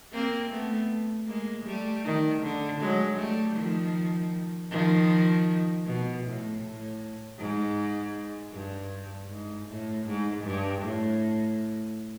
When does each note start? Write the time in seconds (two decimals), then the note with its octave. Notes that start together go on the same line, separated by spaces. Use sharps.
0.13 A#3 C4
0.51 A3 B3
1.28 G#3 A#3
1.66 G3 A3
2.05 D#3
2.42 D3
2.80 F#3 G#3
3.18 G3 A3
3.57 D#3 F3
4.71 D#3 F3
5.86 B2
6.24 A2
6.62 A2
7.38 G#2
8.53 G2
9.29 G#2
9.68 A2
10.06 G#2
10.44 G2
10.82 A2